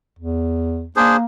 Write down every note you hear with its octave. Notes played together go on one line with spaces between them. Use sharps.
E2
A#3 D4 G#4 C5